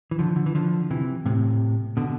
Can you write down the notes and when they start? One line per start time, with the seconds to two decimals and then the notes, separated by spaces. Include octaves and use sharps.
0.11 E3
0.19 D3 F3
0.36 D3
0.46 E3
0.55 D3 F3
0.91 C3 E3
1.26 A2 C3
1.97 B2 D3